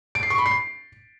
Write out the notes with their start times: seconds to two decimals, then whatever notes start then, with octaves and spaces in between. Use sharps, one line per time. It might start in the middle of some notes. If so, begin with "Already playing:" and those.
0.15 D7
0.23 C7
0.30 C#6
0.38 B5
0.46 C7